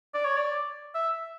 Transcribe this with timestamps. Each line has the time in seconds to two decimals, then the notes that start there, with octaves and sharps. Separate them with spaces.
0.14 D5
0.25 C#5
0.37 D5
0.95 E5